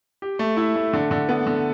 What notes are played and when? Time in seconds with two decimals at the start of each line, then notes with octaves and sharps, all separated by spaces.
0.22 G4
0.39 A3
0.57 E4
0.76 A3
0.93 D3
1.11 D3
1.29 B3
1.47 D3